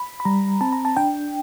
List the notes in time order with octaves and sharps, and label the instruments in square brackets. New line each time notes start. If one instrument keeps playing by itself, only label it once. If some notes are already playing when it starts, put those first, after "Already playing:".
Already playing: [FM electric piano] B5
B5
[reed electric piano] G3 [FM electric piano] A#5
[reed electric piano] C4 [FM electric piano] A5
[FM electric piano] A#5
A5
[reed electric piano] D4 [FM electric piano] G5